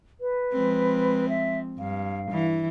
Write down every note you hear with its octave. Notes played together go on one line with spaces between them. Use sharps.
B4
F3 G#3 C4
E5
G2 F5
E3